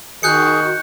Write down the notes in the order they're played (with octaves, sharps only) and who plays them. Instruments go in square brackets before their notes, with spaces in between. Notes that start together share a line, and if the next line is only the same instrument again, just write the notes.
[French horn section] D#3 [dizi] F#4 [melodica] G#4 [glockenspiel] F#6 G6 C#7